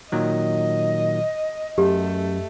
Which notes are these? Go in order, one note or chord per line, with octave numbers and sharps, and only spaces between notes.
A#2 D#3 F#3 D#5
F#2 A3 G4